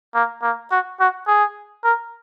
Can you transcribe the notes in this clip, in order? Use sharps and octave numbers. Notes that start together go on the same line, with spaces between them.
A#3
A#3
F#4
F#4
G#4
A#4